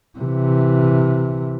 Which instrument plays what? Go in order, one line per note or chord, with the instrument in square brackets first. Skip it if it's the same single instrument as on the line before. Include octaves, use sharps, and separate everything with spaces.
[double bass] C3 E3